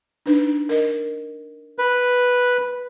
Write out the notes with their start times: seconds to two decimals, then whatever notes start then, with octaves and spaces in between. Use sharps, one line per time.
0.26 D4 D#4 B4
0.69 A#4 D#5
1.79 B4